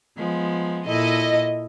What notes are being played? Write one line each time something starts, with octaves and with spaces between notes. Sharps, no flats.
F3 G#3 B3
A#2 E4 A4 D#5